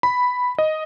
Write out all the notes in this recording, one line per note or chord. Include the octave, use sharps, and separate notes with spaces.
B5
D#5